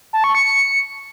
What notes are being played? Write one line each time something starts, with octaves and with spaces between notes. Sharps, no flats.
A5
C#6
C#7
C#7